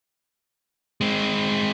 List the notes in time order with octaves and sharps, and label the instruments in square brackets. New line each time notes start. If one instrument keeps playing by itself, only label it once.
[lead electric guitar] G#3 C4